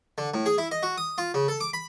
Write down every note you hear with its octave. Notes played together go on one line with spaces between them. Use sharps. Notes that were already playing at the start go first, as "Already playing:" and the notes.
D3
A2
G#4
E4
D#5
F#4
D#6
F4
C#3
A4
D6
B5